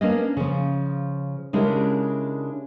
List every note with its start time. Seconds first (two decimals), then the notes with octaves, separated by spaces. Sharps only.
0.01 A#3 B3 C#4 D4 D#5
0.37 C#3 F3
1.53 C#3 G#3 D4 E4 G4 A#4